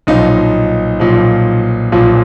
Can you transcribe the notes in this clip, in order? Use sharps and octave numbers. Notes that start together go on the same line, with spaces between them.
B1 A#2 F3 D#4
B1 A#2 F3
B1 A#2 F3